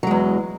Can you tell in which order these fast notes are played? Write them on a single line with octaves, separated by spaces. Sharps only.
F#3 G#3 E2